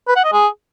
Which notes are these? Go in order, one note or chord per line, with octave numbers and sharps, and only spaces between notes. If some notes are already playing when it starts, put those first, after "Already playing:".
B4
F#5
D#5
G#4